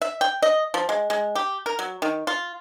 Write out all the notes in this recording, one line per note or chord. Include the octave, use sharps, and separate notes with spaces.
E5
G5
D#5
F3
G#3
G#3
G4
A#4
F#3
D#3
F4